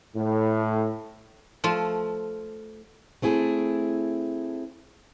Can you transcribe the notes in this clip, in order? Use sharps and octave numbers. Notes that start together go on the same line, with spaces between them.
A2
F3 A3 F4
A3 C4 E4 G#4